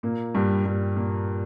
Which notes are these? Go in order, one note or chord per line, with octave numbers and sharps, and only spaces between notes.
A#2 A#3
G2 G3
G2 G3
A#2 A#3